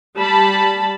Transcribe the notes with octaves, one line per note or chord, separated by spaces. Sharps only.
G3 A5 B5